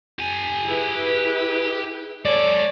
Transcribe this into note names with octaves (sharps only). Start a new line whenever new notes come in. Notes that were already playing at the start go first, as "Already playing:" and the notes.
G4 G#5
E4 G#4 B4
G#3 A4 C#5 D5